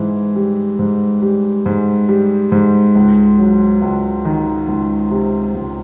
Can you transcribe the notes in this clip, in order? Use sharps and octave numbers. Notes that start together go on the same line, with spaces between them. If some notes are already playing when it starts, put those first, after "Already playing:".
Already playing: G#2 E3
G3
G#2
G3
G#2
G3
G#2
C#2
F#3
C#2
D#3
C#2
C3
C#2